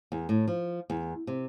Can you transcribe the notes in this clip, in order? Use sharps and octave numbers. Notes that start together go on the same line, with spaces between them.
E2
A2
F3
E2
C3